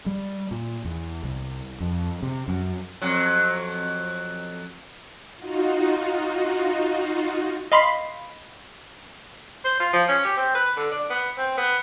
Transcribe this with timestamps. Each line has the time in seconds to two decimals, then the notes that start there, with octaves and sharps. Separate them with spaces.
0.06 G3
0.51 A#2
0.85 E2
1.24 C2
1.80 F2
2.23 C3
2.48 F#2
3.02 F2 F#3
5.37 D#4 F4 F#4
7.72 D#5 F5 B5 C6 B6 C7
9.64 C5
9.80 F4
9.93 F3
10.08 C#4
10.25 G4
10.37 C4
10.55 B4
10.77 D3
10.92 D4
11.10 B3
11.38 C4
11.57 B3